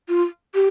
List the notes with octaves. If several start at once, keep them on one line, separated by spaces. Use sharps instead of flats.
F4
G4